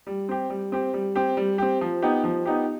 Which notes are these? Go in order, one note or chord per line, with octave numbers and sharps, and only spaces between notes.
G3
C4 G4
G3
C4 G4
G3
C4 G4
G3
C4 G4
F3
B3 D#4 G4
F3
B3 D#4 G4